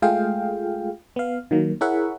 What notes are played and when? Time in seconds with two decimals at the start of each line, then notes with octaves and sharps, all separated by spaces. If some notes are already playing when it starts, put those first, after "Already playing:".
0.02 G#3 A3 F4 G#4 F5 G5
1.16 B3 F5
1.51 D#3 F#3 A#3
1.81 E4 G#4 A#4 C#5 E5 F#5